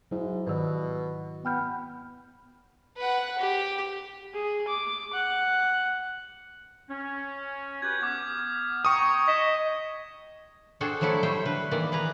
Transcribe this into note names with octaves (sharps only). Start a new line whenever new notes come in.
G#2 F#3 E4
G#2 B2 D#3
B3 G5 F6 G6
B4 F#5
G4
G#4
D6
F#5
C#4
F#4 G4 B4 G6 G#6
B3 D6 F6 G#6
G5 A#5 C#6 D#6
D#5 B6 E7
D4 F#4 G#4 A4 C5 G5
F3 F#3 A3 E4 A4 D5
G3 A3 C5 G5
D3 B4
D#3 E3 A#3 D5 D#5
G#4 B4 A#5